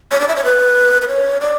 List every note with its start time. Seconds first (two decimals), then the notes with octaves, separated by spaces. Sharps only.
0.11 C#5
0.21 D5
0.28 E5
0.36 C#5
0.45 B4
1.02 B4
1.08 C#5
1.41 D5